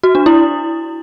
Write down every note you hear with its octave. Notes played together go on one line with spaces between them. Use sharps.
F#4
D4
E4